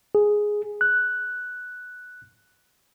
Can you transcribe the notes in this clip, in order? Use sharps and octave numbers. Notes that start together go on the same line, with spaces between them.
G#4
F#6